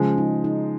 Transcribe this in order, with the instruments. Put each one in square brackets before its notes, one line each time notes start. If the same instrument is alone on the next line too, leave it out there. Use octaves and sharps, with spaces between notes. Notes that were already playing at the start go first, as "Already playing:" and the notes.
Already playing: [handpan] C#3 [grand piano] F3 G#3
[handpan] D#4
D#4